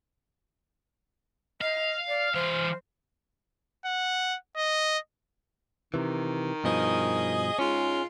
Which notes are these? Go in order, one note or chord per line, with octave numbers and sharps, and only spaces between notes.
D#5 F5
D5
E3 C5 F5
F#5
D#5
C3 D#3 E3
G2 B2 F3 G#4 D#5
G#2 G#3 C#4 F4